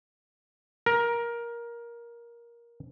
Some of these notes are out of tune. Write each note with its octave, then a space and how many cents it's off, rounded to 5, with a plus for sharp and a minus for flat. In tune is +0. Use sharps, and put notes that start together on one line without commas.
A#4 +15